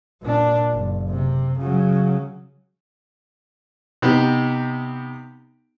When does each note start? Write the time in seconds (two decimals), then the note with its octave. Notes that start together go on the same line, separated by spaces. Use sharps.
0.22 A#2 D4
0.73 F#1
1.09 C3
1.59 C#3 F#3
4.02 C3 B3 D#4 G4